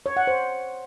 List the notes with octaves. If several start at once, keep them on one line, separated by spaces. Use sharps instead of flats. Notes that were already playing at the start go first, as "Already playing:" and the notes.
C#5
F#5
C5